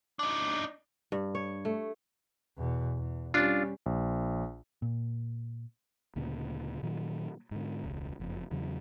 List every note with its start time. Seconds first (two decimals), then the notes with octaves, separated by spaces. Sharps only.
0.19 D4 D#4
1.12 G2
1.35 C#5
1.65 A3
2.58 E2 B2
2.97 E2
3.34 G3 C#4 D4 F4
3.86 A#1
4.82 A#2
6.16 D2 A#2 C#3
6.83 A#2 D#3 F#3
7.51 G#2 D3
7.84 E1 C#2
8.20 F#1 F2
8.51 E2 C#3 F#3